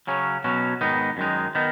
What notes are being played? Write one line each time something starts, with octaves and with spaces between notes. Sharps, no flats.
C#3 F#3 C#4
B2 F#3 C#4
G#2 D#3 B3 D#4
F#2 D#3 G#3 D#4
D#3 B3 D#4